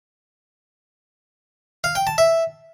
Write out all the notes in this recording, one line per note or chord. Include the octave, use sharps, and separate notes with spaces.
F5
G5
A5
E5